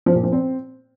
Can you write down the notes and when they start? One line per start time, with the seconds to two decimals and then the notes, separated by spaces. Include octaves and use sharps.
0.06 F3
0.15 A#2
0.24 F3
0.32 C4